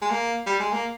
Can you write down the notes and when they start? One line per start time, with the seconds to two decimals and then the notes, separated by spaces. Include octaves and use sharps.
0.02 G#3
0.10 A#3
0.46 G3
0.60 G#3
0.72 A#3